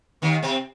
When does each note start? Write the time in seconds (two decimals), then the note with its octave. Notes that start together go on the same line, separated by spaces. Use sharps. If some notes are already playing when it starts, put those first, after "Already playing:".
0.22 D#2 D#3
0.42 C3 C4